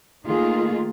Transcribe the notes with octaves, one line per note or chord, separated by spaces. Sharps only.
D#3 A3 A#3 F4 G#4